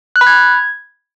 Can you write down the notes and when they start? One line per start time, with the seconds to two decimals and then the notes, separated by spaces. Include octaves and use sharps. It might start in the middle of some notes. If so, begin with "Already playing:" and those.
0.16 F#6
0.21 B5
0.27 G#6